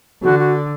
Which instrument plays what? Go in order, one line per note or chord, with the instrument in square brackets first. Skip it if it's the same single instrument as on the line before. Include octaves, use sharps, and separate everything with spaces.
[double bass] D3 [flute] F#4
[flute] F#4